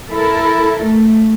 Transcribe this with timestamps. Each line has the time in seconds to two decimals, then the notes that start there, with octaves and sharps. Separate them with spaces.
0.12 E4 A4 A#4
0.83 A3